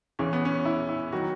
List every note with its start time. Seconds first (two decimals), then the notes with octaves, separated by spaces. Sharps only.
0.19 E2 C#3 E3 C#4
0.33 B3
0.45 C#4
0.65 E4
0.89 E4
1.12 D#3 F#3 F#4